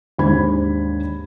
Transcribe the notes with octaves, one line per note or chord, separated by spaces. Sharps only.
D#2 G#2 D4 C5 B5 G#6